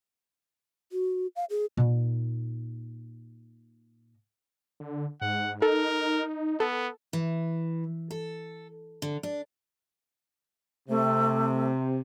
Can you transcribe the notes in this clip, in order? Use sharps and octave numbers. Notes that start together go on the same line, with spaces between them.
F#4
F5
G#4
A#2 D#4
D3
G#2 F#5
D#4 A4 A#4
B3 A4
E3
A4
D3
D4
C3 A3